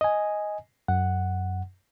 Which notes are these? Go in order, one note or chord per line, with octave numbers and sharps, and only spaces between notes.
D#5 G#5
F#2 F#5